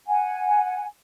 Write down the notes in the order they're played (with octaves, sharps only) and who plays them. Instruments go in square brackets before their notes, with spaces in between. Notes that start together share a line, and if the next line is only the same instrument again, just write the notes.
[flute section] F#5 G#5